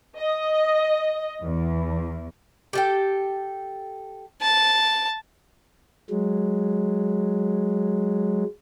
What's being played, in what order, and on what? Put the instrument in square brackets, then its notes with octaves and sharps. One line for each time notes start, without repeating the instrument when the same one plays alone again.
[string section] D#5
E2
[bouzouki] G4 A4 G5
[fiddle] A5
[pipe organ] F#3 G#3